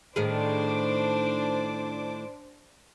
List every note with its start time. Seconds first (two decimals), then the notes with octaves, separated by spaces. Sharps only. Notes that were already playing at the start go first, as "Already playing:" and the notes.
0.16 A2 D#3 D4 G#4 C5 D6